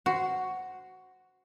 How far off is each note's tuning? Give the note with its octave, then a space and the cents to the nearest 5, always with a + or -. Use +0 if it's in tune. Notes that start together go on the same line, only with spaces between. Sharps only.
F#4 +5 C5 -5